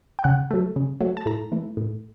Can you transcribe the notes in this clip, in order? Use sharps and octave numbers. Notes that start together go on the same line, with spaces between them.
G5
C#3 F#5
F#3 A3
C#3
F#3 A3
A5
A2 A#5
E3 A3
A2